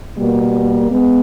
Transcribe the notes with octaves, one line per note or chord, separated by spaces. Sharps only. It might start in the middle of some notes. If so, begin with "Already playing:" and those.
B2 G3 A#3
G#3 B3